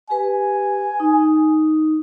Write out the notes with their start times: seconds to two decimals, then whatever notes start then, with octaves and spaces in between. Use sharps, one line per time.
0.10 G4 B4 G#5
1.00 D#4